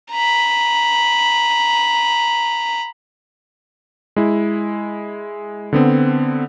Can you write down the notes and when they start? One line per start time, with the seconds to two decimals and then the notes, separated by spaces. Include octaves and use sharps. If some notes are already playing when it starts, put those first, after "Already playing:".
0.12 A#5 B5
4.16 G#3 E4
5.73 D3 B3 C4